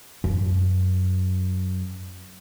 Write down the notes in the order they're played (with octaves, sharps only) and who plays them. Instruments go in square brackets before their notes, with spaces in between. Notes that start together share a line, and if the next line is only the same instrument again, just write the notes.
[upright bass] F#2